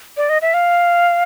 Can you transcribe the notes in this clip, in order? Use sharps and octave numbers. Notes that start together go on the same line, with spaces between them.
D5
D#5
E5
F5